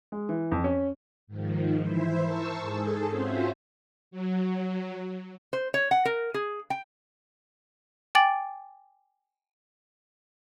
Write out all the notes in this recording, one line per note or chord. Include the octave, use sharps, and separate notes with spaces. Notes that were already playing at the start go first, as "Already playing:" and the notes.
G#3
E3
F2
C#4
G#2 D#3 F3
E3 E4 C5 E5
A#4 C5 A5 C#6 E6
G#2 G#4 A4
C4 C#4 F4 F#4 C5 E5
F#3
C5
C#5
F#5
A#4
G#4
G5
G5 G#5 D6 A6 D7 F#7